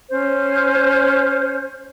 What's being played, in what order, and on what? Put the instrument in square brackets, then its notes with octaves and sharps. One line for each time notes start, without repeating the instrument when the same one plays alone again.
[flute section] C#4 C5